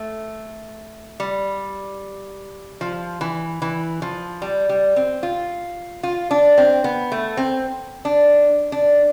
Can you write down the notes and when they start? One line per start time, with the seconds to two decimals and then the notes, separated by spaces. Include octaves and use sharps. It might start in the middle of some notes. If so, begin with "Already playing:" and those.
Already playing: A3
1.20 G3
2.81 F3
3.21 E3
3.62 E3
4.02 F3
4.42 G3
4.69 G3
4.96 C4
5.23 F4
6.03 F4
6.31 D4
6.58 C4
6.84 B3
7.12 A3
7.37 C4
8.05 D4
8.72 D4